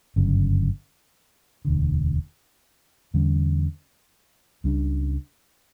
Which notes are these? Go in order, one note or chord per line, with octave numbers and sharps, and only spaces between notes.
G1 F#2 C#3
E1 D2 D3
E2 D3 G3 C#4
C#2 C#3 G3 D4